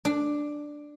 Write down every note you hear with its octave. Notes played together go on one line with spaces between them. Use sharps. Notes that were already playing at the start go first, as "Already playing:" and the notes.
D4